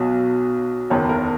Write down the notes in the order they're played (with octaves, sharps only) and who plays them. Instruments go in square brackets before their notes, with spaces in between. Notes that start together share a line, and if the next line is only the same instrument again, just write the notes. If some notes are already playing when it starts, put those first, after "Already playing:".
Already playing: [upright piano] B1 B2 F#3
F#1 E2 D#3 C#5
A#4